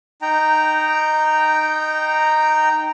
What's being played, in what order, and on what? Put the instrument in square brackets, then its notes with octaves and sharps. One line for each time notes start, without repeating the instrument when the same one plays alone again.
[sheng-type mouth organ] D#4 G5 A#5